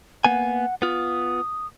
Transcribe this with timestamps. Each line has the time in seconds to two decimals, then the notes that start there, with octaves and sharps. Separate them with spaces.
0.25 A#3 B3 F#5 G#5
0.82 B3 F4 D#6